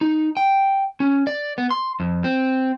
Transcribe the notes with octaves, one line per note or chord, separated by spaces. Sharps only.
D#4
G5
C#4
D5
B3
C6
F2
C4